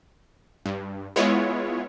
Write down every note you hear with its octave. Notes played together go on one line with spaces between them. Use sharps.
G2
G#3 B3 E4 F4 C#5